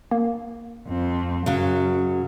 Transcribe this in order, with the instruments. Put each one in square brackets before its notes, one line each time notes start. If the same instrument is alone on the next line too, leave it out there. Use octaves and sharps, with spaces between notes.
[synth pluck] A#3
[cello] F2 C4
[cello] F#2 [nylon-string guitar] C#3 F#3